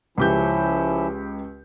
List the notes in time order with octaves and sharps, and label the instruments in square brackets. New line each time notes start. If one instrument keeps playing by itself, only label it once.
[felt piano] C#2 G4 G6 [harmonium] F3 C#4 E4